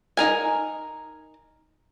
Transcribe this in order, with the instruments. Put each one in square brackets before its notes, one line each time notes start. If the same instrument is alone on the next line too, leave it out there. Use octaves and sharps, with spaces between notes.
[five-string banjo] D#4 A#4 G#5